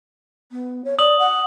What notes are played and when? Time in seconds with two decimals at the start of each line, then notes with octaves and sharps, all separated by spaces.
0.52 B3
0.85 C#5
0.99 D5 D#6 F#7
1.19 F#5